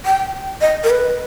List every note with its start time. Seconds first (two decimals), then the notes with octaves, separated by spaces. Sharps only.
0.06 G5
0.61 D#5
0.84 A#4
0.90 B4